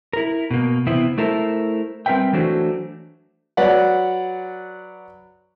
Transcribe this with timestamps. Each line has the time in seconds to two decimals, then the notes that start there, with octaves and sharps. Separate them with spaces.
0.13 E4 A#4
0.51 B2 A#3
0.87 C3 E3 B3 C4 E4
1.18 A3 E4 A4 A#4 C5 E5
2.06 G3 C4 A#4 B4 E5 G5
2.33 E3 F#3 A3 D4 F#4 C5
3.57 F#3 B4 D5 F#5